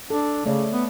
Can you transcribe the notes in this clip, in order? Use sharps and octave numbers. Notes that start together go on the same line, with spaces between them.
D4 A4
C#3 A3 C#5 D5
B3